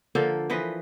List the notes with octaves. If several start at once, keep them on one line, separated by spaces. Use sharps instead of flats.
D3 F3 A#3 A4
E3 F3 B4 D#5